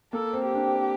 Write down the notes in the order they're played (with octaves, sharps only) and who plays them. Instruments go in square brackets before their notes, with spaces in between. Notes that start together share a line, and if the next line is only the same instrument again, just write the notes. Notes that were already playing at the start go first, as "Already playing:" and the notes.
[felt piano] A#3 [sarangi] A4
[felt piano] C4
[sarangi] G4
[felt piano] D4
C4